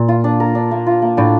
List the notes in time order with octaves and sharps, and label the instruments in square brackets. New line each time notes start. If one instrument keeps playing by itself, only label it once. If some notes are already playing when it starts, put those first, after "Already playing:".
Already playing: [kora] A#2
[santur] F4
D4
A#4
D4
A#3
F4
A#3
[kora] A2 [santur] D4